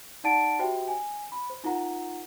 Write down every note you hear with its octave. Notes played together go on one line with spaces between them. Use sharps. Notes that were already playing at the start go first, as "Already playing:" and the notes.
D#4 D5 F#5 A5 A6 D7
F#4 G4 C5 E5 G5
G#5
B5
C5
D#4 F4 A#4 F#5 A#5